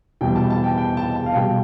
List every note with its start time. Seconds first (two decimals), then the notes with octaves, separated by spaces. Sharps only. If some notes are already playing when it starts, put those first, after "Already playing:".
0.21 E2 B2 G3 G5
0.35 A5
0.50 A5
0.64 G5
0.78 G5
0.97 A5
1.16 A5
1.26 F5
1.35 B2 G3 G5